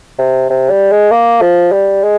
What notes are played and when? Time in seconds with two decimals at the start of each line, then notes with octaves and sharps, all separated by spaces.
0.19 C3
0.50 C3
0.70 G3
0.91 G#3
1.11 A#3
1.41 F3
1.72 G3
2.03 G#3